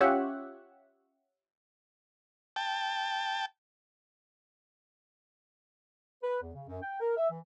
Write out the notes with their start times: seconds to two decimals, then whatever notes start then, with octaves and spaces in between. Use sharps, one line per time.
0.01 C#4 F4 G4 C#5 E5 F#5
2.56 G5 A5
6.23 B4
6.42 E2
6.54 C#3
6.68 F#2
6.82 G5
7.00 A#4
7.17 E5
7.30 E3